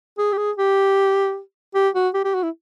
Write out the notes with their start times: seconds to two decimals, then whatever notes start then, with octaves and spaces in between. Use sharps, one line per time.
0.18 G#4
0.33 G4
0.38 G#4
0.57 G4
1.75 G4
1.95 F#4
2.14 G4
2.24 G4
2.34 F#4
2.43 E4